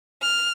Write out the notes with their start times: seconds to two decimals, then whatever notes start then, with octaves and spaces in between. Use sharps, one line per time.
0.21 F6